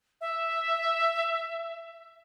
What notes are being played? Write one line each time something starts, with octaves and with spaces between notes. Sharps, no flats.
E5